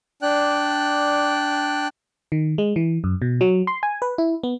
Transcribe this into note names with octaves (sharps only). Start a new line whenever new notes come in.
D4 D5 G5 F#6
D#3
G#3
E3
F#2
B2
F#3
C6
G#5
B4
E4
B3